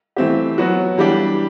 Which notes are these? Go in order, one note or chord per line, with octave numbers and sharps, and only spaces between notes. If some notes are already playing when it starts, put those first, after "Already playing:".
E3 A3 C4 G4
F#3 B3 F#4
E3 G3 D4 G4